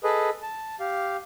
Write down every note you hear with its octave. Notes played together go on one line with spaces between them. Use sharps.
G#4 A4 B4 D#5
A5
G4 F5